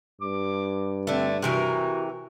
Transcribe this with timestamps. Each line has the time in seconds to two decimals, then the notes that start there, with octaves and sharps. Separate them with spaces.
0.21 G2 D6
1.07 D3 A3 C4
1.43 C3 E3 F#4 A#4